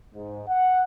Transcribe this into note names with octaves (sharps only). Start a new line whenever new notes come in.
G#2
F#5